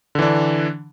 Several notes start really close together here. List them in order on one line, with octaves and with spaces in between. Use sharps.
D3 E3 D4